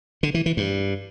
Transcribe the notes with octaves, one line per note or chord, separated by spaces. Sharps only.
D3
E3
E3
G2